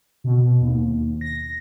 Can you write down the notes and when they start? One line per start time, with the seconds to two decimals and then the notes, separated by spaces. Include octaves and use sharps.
0.24 B2
0.61 D#2
1.21 A#6